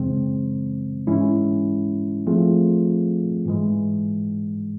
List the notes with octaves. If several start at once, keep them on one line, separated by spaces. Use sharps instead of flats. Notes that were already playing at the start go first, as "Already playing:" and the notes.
Already playing: F#2 C#3 E3 G#3 C4
G#2 E3 G#3 C#4 E4
F3 A3 C4 F4 G#4
G#2 E3 G#3